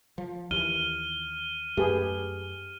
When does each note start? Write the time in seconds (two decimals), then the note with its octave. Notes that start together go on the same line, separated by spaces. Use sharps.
0.18 F3
0.51 D#2 E3 F6 D#7 G7
1.77 F#2 A3 G4 G#4 B4